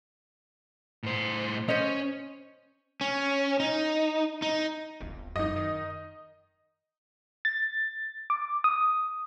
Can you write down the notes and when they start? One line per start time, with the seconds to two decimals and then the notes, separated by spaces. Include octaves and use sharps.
1.03 A2 C5
1.68 C#4 C5 D#5
3.01 C#4
3.60 D#4
4.42 D#4
5.00 D1 G1
5.36 E1 F#2 D#4 D#5
5.56 D#3
7.45 A6
8.30 D6
8.64 D#6